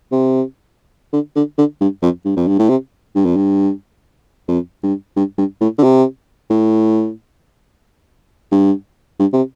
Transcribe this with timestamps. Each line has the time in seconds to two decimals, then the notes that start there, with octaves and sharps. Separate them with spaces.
0.12 C3
1.12 D3
1.36 D3
1.58 D3
1.81 G2
2.02 F2
2.25 G2
2.37 F2
2.47 G2
2.59 A2
2.69 C3
3.15 G2
3.25 F2
3.36 G2
4.48 F2
4.83 G2
5.16 G2
5.38 G2
5.61 A2
5.78 D3
5.83 C3
6.50 A2
8.52 G2
9.19 G2
9.33 C3